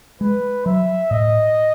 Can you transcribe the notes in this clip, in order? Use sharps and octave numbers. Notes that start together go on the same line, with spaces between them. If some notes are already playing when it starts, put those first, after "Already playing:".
G#3 B4
F#3 E5
A2 D#5